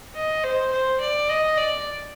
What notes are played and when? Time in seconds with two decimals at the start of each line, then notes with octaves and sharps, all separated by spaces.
0.15 D#5
0.44 C5
0.72 C5
1.01 D5
1.29 D#5
1.58 D5